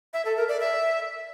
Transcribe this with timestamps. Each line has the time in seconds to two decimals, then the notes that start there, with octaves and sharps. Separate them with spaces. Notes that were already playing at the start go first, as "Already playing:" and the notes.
0.14 E5
0.25 A4
0.37 A#4
0.49 D5
0.60 E5